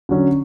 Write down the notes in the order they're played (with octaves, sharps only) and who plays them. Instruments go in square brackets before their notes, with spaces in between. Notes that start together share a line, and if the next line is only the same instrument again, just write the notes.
[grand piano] D3 F#3 C#4